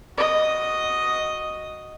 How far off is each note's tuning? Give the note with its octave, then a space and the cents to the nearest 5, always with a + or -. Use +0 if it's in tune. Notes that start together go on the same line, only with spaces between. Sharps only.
F#4 +0 D#5 +0